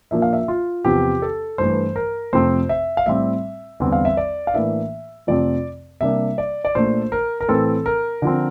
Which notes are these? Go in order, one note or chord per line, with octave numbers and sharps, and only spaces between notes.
A#2 F3 A#3 D4 E5
F5
E5
F4
E2 C3 F3 C4 G4
A4
G2 E3 A3 C5
A#4
F2 C3 F3 A3 C4 C5
E5
F5
A2 G3 C4 E5
E2 D3 G3 C4
F5
E5
D5
F5
A2 E3 A#3 D4 E5
F2 C3 F3 A3 C4 D5
C3 G3 A#3 D4 E5
D5
D5
A#2 A3 D4 C5
A#4
A#4
A2 E3 A3 C4 A4
A#4
D3 F3 C4